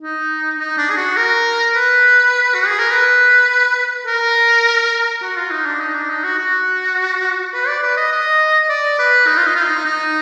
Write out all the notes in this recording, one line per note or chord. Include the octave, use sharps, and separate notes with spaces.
D#4
D#4
D4
G#4
F#4
A#4
B4
F#4
G#4
A#4
B4
A#4
F#4
F4
D#4
D4
D#4
D4
D#4
F#4
F#4
B4
D5
B4
D#5
D#5
D5
B4
D#4
F4
D#4
F4
D#4
D#4